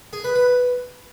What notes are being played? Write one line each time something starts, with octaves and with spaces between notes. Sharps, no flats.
G#4
B4
B4